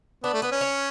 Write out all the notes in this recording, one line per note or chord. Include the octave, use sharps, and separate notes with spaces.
B3 D4
A3
B3 B4
C#4
C#5